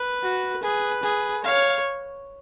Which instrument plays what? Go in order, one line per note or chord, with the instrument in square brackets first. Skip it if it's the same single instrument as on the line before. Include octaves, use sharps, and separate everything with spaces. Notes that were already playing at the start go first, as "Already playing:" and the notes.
Already playing: [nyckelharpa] B4
[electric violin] F#4
[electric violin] G#4 [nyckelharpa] B4
[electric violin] G#4
[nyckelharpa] C#5 [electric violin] F5